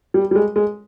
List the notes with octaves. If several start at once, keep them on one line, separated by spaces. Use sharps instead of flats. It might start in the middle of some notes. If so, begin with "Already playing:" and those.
G3
G3
G#3
G#3